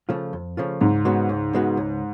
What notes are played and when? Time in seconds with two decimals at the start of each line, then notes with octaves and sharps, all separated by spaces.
0.09 C#3 F3 A3 F4
0.33 F2
0.57 C#3 F3 A3 F4
0.80 C#2 G#2
1.05 C#3 G#3 B3 F#4
1.29 C#2
1.53 C#3 G#3 B3 F#4
1.77 C#2